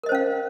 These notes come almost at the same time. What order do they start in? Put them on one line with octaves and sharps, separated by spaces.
A#4 D#5 C5 C#4 F5